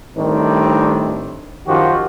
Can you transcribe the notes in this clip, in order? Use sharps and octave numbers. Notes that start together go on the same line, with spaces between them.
A2 D#3 G3 C4 D4
F#2 D#3 F3 F#4 G4